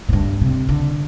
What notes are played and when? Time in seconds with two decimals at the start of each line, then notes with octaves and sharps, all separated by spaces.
0.09 A2
0.13 G2
0.41 C3
0.69 D3